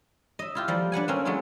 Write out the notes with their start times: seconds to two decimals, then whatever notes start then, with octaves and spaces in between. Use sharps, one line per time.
0.39 D#5 E5
0.55 E4 F4 G4
0.68 F3 G3 A#3
0.92 D4 B4 F#5 G#5
1.08 A#3 C4 C#4
1.25 F#3 G#3 A3 C#4 E4